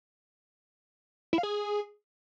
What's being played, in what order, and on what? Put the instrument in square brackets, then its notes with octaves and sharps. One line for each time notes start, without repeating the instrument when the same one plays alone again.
[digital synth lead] E4
F5
G#4